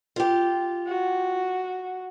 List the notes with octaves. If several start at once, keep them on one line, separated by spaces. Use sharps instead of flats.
F4 G4
F#4